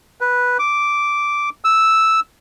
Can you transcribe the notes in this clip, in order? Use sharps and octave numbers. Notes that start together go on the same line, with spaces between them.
B4
D6
E6